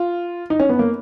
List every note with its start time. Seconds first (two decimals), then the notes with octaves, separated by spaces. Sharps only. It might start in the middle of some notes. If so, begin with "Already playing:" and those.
Already playing: F4
0.50 D#4
0.60 C#4
0.69 B3
0.79 A#3